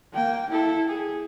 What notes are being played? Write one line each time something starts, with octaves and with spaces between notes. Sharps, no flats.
A#3 G5
E4 A4
G#4